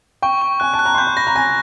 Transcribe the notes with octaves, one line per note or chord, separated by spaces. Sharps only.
G5 C#6
C#6
G#5 F#6
A5
F#6
A#5
C6
B5 G6
C6
B5 A#6
A#5
G#5 A#6